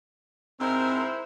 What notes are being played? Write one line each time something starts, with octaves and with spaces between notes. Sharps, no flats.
G#2 G#3 C4 E4 A#4 C5